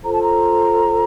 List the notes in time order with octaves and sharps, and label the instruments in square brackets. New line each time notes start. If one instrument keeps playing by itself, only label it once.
[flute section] F4 A4 C5 A#5
A5
A#5